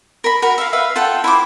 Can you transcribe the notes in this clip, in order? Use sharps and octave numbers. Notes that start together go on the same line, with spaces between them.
A#4 B5
F#4 A#4 B5
E5 F5
B4 E5 F5
F4 A4 F#5 G5
E4 C5 D6